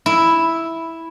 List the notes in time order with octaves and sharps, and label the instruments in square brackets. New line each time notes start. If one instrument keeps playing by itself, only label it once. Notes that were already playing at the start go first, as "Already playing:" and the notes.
[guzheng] E4